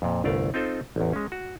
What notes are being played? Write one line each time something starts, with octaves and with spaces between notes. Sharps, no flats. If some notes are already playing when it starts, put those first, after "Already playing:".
F2 A#2
G1 C2 A3 D5 F5
C4 D#4 F4 A4 C5
A1 E2
G#3 C#4
F#4